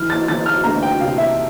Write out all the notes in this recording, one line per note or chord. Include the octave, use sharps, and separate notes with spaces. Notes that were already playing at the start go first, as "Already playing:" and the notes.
Already playing: E3 F6
A6
E3 A6
F6
D2 A#5
G5
C3 F5
E5